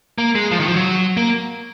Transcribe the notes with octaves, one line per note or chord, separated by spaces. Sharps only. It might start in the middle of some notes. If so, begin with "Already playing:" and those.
A#3
G#3
F3
D#3
F3
F#3
A#3